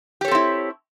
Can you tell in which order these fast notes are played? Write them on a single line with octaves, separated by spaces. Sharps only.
G4 C#5 A4 C4 E4